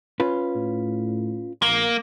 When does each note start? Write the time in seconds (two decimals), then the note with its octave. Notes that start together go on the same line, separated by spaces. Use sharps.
0.20 C#4 F4 B4
0.56 A2
1.62 A#1 A#3